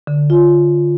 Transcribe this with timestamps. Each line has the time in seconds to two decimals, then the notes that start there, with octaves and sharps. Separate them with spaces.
0.07 D3
0.30 F4